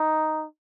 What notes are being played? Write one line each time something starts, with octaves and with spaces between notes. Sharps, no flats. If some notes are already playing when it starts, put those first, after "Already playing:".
Already playing: D#4